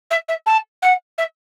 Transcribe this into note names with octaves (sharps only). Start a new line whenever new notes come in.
E5
E5
A5
F#5
E5